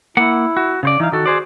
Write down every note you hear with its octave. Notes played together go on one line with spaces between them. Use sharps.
A#3 E4 F#5
F#4
C#3 C5 D5
E3 D#4 E4 F5
D#3 F#4 A4
G#4 C5 D5